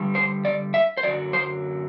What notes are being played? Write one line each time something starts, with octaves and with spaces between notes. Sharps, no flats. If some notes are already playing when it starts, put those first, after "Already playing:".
Already playing: G2 D3 G3
C5
D5
E5
C5
F#2 D3 F#3 D5
C5